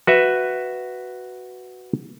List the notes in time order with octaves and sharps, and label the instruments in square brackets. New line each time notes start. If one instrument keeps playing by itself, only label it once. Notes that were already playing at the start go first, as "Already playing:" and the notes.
[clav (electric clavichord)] F#4 B4 E5